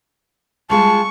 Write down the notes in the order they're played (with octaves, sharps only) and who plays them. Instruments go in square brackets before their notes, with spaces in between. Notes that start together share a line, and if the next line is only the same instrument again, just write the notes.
[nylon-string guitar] G3 G#3 F4 [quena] A5 [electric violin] C#6